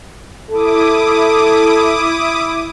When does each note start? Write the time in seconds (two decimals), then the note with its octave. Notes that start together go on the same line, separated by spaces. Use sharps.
0.51 E4 A4 D6 D#6